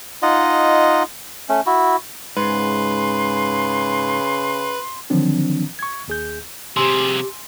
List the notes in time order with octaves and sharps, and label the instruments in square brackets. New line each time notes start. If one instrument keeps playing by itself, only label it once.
[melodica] D#4 F4 D#5 F#5
A3 C#4
E4 F#4
[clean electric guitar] G#2 [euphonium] C#3 [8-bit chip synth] B4 [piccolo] C6
[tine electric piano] D3 D#3 F3 F#3 C4 D4
C#6 G#6
D#2 G#4 G6
[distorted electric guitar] C3 G#4 [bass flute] G4 [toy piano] G#5 C6 E6